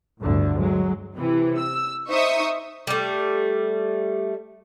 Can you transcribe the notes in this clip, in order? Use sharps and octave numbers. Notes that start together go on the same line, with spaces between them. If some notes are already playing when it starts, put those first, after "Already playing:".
G1 D2 A2 D3
F#3 G#3
C3 E3
E6
D#4 C5 E5 C#6 D#6
G3 A3